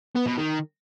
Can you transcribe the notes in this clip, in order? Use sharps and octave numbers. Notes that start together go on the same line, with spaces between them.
B3
B2
D#3